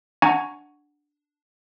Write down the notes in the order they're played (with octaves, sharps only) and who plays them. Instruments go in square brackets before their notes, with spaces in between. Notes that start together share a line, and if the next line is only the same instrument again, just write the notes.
[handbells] D4 F#5 G#5 A#5 C#6 G#6